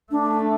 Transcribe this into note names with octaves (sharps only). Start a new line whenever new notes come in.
A3 D4